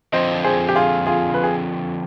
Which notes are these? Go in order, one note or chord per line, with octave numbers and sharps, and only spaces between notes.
D3 F3 C4 C5 D#5
G#4 C5
G4
F4 G#4
F4 G#4
B4
G#4